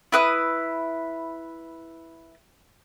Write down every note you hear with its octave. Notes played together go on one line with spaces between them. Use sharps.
E4 B4 D#6